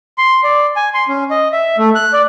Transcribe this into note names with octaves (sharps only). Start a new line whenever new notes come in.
C6
D5
G#5
C6
C#4
D#5
E5
A3
F#6
D5